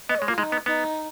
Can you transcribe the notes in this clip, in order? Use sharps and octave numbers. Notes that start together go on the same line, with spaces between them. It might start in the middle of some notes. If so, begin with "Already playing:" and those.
B3 D#5
C#5
G#3
A#3 F4
G#3 D#4
B3
B3 D#4